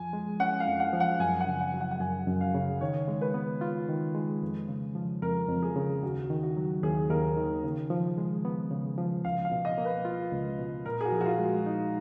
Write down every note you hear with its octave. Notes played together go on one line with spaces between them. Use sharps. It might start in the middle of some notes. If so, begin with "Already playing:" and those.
Already playing: F2 F3 G#5
G#3
C#4 F#5
F5
F2
F#5
F3
F#5
F#2 G#5
F#5
C#3
F#5
F#3
F#5
F#5
F#2 G#5
F#2
F5
C#3
D#3 C#5
G#3
B4
B3
F4
D#3
G#3
F2
C#3
F3
F2 A#4
F2
G#4
C#3
D#2 F#4
D#3
F#4
F#3
D#2 G#4
D#2 A#4
D#3
C#3
F3
G#3
B3
C#3
F3
C#2 F5
F5
B2
D#5
A#3
B4
F4
C#2
B2
A#2 A#4
G#4
F#4
F3
F#4
F4
G#3
D#4